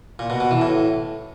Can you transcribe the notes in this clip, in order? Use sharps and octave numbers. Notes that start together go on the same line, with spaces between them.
A#2
B2
B2
E3
A2